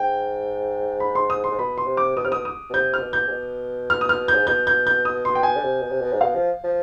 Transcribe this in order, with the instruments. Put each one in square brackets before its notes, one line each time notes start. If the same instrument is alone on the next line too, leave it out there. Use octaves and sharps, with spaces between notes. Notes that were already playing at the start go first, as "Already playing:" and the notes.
Already playing: [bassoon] G#2 [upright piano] G5
[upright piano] B5
C6
D#6
C6
[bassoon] G#2
[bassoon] B2 [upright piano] B5
[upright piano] C6
[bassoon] C3
[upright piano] D6
[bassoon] B2 [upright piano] D#6
[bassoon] C3 [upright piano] F6
[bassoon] B2 [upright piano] D#6
[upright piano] D#6
[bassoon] B2
[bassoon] C3 [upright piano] G6
[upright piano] F6
[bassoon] B2
[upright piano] G6
[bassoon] G#2
B2
[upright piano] F6
D#6
F6
G6
[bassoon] G#2
[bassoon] B2 [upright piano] G6
[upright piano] G6
G6
D#6
C6
G5
G#5
[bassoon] D3
C3
B2
C3
B2
G#2
[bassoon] B2 [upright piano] F5
[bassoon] F3
F3